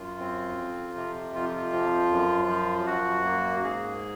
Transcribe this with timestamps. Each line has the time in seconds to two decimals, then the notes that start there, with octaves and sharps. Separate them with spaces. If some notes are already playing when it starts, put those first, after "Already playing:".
Already playing: F#2 F4
0.20 C4
0.57 F2
0.96 C3
1.35 F2 F4
1.55 F4
1.73 F3
2.11 F#2
2.49 F3
2.87 F#2 F#4
3.25 A#3
3.63 G#2 G#4